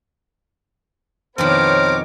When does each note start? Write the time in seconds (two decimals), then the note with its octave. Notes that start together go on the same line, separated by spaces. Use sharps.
1.38 F2 B2 D#3 B3 A#4 C5 C#5 D6